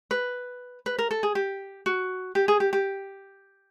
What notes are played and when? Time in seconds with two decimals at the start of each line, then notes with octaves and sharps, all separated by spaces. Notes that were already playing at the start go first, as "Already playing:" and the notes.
0.11 B4
0.86 B4
0.99 A#4
1.11 A4
1.23 G#4
1.35 G4
1.86 F#4
2.35 G4
2.48 G#4
2.60 G4
2.73 G4